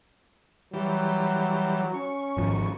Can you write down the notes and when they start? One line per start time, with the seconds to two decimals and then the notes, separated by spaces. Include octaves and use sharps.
0.73 E3 F#3 G3
1.94 C#4 C#6
2.37 G#1 F3